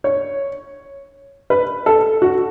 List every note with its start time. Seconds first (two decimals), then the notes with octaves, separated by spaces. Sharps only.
0.04 C#5
1.50 B4
1.86 A4
2.22 F#4